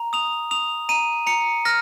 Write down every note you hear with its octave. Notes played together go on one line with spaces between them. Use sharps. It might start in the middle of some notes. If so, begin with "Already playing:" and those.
Already playing: A#5
D#6 F7
D#6 F7
A#5 D#7
A#5 C#7
F6 A#6